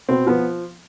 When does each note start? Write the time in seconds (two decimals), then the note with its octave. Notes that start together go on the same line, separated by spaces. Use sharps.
0.09 B2 C4
0.27 F3 B3